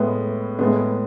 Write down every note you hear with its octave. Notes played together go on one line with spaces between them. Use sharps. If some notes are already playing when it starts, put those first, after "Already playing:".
Already playing: A2 G#3 B3
A2 G#3 B3